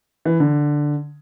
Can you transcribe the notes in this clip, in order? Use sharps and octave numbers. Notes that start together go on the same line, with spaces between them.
E3
D3